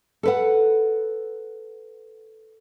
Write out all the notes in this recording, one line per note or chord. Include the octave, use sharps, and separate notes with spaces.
A4 B4 F#5